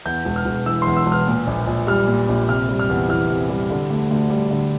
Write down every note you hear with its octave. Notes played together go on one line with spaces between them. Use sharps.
E2 G6
E1
F6
E1
E3 E6
E2 C6
E6
E1
F6
A#2
A#1
A#1
G3 F6
A#2
A#1
C3 F6
G3
F6
E2
E3 F6
C3
G3
D3
D2
D2
G3
D3